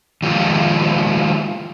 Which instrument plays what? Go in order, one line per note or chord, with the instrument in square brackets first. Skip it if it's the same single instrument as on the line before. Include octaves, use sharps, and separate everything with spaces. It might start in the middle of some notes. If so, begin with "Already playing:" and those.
[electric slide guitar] D#3 F3 G#3 E4 F4